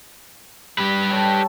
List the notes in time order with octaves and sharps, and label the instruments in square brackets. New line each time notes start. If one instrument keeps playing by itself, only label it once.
[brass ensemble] G3 [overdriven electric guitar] G4 B4
[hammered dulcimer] A4 C#5 G5